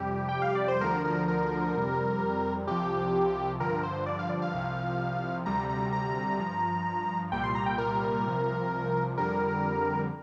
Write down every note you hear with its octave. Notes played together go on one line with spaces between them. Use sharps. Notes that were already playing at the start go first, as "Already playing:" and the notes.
Already playing: F2 C3 G3 G4
G5
F5
D5
C5
D2 D3 F3 A#4
A#4
A#4
F2 C3 G3
C2 C3 F3 G4
G2 D3 F3 A#4
C5
D5
F5
D5
F5
C2 C3 F3
D2 C3 G3 A#5
A#5
A#5
G2 F3
C2 A#2 G3 G5
C6
A#5
G5
A#4
C2 C3 F3
F2 D3 G3 A#4